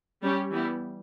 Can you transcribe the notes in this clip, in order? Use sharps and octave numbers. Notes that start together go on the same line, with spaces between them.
G3 C#4 G4
E3 G3 B3 E4